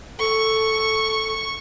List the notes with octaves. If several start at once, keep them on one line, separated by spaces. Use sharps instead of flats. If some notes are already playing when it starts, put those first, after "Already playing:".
A4 C#6